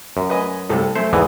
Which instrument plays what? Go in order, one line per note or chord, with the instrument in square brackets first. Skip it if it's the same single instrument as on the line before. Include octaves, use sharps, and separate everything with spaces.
[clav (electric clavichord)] F#2
[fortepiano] B4 D#5 G#5
C2 C3 A4
[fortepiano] F#2 A3 [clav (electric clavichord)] C5
[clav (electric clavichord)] E2 G#2 E3 [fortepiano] D#6